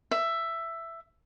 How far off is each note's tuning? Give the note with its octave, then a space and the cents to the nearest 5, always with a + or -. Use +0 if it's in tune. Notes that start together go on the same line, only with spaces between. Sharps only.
E5 +10